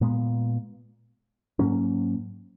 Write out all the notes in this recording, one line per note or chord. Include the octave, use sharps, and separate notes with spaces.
A#2 G#3 B3
G#2 F#3 A#3 C#4